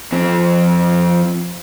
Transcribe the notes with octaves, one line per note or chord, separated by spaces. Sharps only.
F2 C4